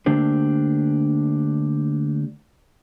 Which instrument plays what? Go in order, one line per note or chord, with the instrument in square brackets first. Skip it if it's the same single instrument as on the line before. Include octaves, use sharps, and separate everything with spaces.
[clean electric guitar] D3 A3 A#3 D4 G4 C5